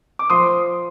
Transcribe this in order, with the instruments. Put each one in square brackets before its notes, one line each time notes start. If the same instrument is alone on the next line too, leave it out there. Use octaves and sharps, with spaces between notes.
[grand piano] D6
F3 C6 D#6